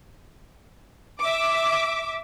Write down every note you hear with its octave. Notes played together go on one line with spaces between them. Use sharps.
E5 D6